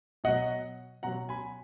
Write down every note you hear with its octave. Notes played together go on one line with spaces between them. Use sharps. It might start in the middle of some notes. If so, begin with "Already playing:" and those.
B2 F#3 D#5 F#5
B2 F#3 F#5 A#5
G#5 B5